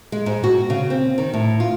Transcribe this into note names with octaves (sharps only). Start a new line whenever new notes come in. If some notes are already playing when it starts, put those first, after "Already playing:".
G#3
G#2
F#4
C#3
C4
D#3
A2
F4